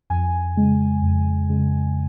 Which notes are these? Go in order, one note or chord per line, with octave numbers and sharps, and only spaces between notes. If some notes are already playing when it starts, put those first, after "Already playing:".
F2 G#5
C#3 G#3
F2
C#3 G#3